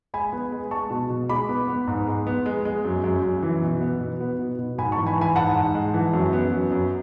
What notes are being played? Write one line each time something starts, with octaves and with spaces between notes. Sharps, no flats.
G#3 G#5 B5
B3
G#3
G#3 A5 C#6
B2
B2
G#3 B5 D6
B3
B3
G#2
G#3
B3
G#3
G#3
F#2
F#2
F#2
E3
B2
B3
B2
B3
B2
B2
G#2 G#5 B5
A5 C#6
E3
G#5 B5
E3 G#5 B5
G#2 F#5 A5
G#2
G#3
E3
F#2
B3
F#2
F#2